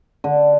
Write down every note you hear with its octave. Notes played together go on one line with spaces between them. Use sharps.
D3